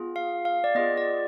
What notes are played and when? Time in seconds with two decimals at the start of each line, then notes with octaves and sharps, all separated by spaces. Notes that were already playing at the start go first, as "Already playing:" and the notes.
Already playing: B3 F4 G#4
0.16 F5
0.45 F5
0.64 D5
0.75 B3 F4 G#4 D#5
0.97 D5